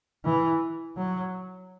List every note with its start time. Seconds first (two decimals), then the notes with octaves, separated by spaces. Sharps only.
0.25 E3
0.98 F#3